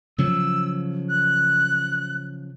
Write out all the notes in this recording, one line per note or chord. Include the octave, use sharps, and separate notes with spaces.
C#3 F3 F#3 E6
F#6